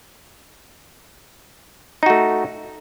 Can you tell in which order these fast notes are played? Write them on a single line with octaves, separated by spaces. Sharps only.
D#4 F#4 A3